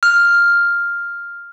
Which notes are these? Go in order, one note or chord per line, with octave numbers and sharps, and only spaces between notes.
F6